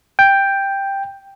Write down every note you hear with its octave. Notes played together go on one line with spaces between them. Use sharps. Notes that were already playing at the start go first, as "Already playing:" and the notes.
G5